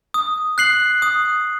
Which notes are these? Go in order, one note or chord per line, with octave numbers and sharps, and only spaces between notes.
D#6
F#6 C7 F#7
D#6